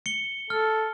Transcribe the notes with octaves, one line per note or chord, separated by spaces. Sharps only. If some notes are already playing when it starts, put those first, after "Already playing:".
C#7 G7
A4 F6